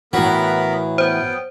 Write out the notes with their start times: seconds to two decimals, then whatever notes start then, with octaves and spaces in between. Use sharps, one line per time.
0.13 A2 E3 F#3 B3 A#4 B5
0.98 B3 C5 G5